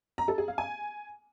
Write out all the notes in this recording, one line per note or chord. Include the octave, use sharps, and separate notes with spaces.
A#5
A4
G#4
F5
G#5